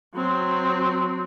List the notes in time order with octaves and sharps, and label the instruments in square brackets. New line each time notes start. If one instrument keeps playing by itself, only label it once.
[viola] F#3 C4